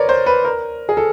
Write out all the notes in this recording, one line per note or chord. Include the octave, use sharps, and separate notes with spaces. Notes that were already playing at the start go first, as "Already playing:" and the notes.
Already playing: A#4 B4 C#5 D5
C5
B4
A#4
G#4
A4